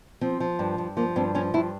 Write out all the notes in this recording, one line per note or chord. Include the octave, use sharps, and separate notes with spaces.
F3 C4
F3
G2
G2
F3 A#3
G2 C4
F3 C#4
G2 E4